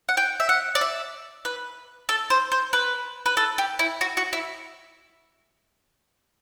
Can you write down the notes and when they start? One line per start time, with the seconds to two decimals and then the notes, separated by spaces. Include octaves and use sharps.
0.09 F#5
0.17 G5
0.40 E5
0.49 F#5
0.75 D5
0.81 E5
1.45 B4
2.09 A4
2.30 C5
2.52 C5
2.73 B4
3.26 B4
3.37 A4
3.58 G4
3.79 E4
4.01 F#4
4.17 F#4
4.33 E4